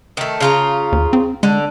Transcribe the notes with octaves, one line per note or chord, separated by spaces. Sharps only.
D#3 A3
C#3 F4 A#5
D#2
C4
D3 G#3